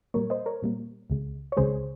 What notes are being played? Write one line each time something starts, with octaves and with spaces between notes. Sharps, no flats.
A#2 G3 A#3 A#4 C#5
C5 D#5
A#4 C#5
A#2 G3 A#3
C#2 C#3 G#3
C#5
C#2 C#3 G#3 G#4 C5